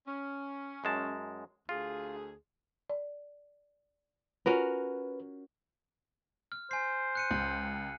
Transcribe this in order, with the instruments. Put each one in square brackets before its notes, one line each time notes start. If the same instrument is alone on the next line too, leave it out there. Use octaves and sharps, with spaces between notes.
[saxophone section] C#4
[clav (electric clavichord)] F#2 G#3 A5
[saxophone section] D2 G#4 [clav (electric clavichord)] F4
[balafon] D5
[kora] C#4 F#4 A#4 [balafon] F4 [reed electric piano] B4
[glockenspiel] F6
[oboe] C5 [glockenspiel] G#5 C7
[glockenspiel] F#6 C#7 D#7
[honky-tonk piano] C#2